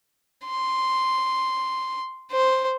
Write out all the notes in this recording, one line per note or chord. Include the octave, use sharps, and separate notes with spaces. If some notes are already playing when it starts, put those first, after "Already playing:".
C6
C5